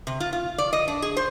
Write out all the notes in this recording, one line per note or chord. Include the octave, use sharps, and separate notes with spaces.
C3
F4
F4
D5
D#5
D4
G#4
C5